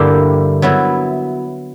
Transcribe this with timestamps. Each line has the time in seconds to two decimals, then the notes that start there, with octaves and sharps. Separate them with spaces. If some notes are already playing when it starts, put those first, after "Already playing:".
Already playing: G2 D3 A#3 E4 G4
0.62 F#3 B3 E4